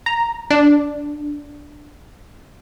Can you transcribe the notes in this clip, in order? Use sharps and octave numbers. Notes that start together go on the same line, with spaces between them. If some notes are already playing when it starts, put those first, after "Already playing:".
A#5
D4